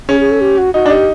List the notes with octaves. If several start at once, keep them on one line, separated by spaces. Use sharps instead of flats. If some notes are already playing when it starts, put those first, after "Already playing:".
C#4 G#4
G#4
A4
G4
F#4
D#4 F#4
D4
D#4 G4